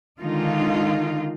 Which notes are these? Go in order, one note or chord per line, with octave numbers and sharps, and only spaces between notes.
D3 D#3 G#3 D#4 F4 F5